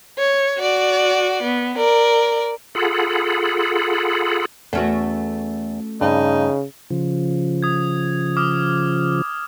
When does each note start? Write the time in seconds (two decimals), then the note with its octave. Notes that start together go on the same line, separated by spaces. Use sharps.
0.18 C#5
0.58 F#4 D5
1.43 B3
1.77 A#4 D5
2.75 F4 G#4 A4 F#5 B5
4.73 E2 A3 C#4 F#4
6.01 G2 C#3 D#4
6.90 C#3 F3
7.63 D#6 G#6
8.37 D6 D#6 F6